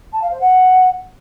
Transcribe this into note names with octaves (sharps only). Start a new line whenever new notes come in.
A5
F5
C5
F#5